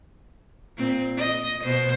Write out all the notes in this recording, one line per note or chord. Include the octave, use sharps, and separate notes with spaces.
A#2 C4
D#5
B2 C5